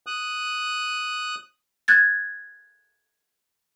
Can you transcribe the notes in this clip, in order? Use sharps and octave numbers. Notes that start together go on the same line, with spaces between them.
D#6 F#6
F#6 G#6 A6